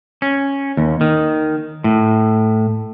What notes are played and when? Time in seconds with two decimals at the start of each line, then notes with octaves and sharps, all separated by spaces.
0.22 C#4
0.77 D#2
1.01 D#3
1.84 A2